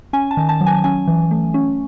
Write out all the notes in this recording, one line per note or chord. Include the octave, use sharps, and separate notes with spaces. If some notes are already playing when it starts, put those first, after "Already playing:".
C#4 G#5
A5
D#3
A5
F#3
G#5
C#4 G#5
E3
A3
C#4